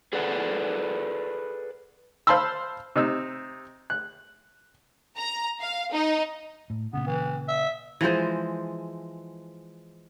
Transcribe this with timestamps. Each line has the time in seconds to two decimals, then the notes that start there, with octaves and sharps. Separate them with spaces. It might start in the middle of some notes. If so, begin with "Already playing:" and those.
0.13 G#4 A4 B4 D5 F#5
2.27 C5 F5 A5 B5 C6 E6
2.96 C3 D#4 E6
3.90 F#6
5.17 A#5
5.60 F5
5.91 D#4
6.70 A2
6.93 A#2 C#3 B3
7.06 E3
7.48 E5
8.01 E3 F3 G#3 C5